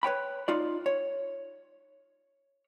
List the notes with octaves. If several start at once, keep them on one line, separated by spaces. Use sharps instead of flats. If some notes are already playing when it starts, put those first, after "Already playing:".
B4 C#5 G5 B5
D#4 F4 D5
C#5